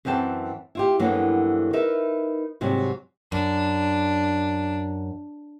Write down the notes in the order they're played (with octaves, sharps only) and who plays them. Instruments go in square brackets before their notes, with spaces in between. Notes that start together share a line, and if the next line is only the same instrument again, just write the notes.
[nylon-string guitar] F#2 E3 C4 G5 A5
E4 F4 G4
G2 D3 E3 F#3 A#3 B3
D#4 A#4 B4 E5
G#2 C3 F#3 G3
[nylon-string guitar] F#2 [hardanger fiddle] D4